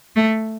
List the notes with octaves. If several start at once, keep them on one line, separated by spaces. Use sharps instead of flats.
A3